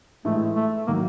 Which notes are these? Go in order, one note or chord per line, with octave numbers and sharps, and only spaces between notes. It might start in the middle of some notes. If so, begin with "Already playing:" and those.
A2 E3 G#3 A3
A3
D#3 F#3 A#3